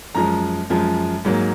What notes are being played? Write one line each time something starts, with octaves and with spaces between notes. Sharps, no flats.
F#2 F3 G#3 A#5
F#2 F3 G#3
G#2 F#3 A#3